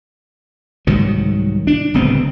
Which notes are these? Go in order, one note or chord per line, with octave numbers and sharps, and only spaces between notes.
C2 G#2 D#3 F#3
D4
D1 C#2 B3 C4